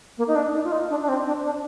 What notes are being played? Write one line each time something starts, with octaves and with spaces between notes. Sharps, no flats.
A#3
D#4
D4
D#4
F4
D#4
D4
D4
C4
D4
D4